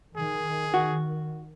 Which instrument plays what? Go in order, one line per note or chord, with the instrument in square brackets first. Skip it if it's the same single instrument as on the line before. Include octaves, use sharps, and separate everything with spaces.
[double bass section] D#3 [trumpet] G#4
[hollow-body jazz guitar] F#4